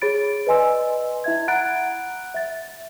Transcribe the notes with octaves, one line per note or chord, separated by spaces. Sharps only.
G#4 C#5 B5 A6 D7
B4 D5 D#5 G#5 C6 E6
E4 E5 G#6
F#5 A#5 B5 F#6 A6 D7
E5 A6